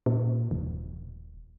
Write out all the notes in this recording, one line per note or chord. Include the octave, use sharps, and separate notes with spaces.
A#2
D#1